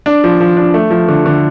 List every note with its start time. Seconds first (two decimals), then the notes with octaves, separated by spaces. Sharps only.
0.06 D4
0.24 F3
0.40 F3
0.57 D4
0.74 A3
0.91 F3
1.08 D3
1.26 D3